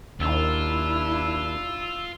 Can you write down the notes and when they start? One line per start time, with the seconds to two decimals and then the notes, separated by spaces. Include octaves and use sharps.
0.20 D#2 D4 E4 F4 E6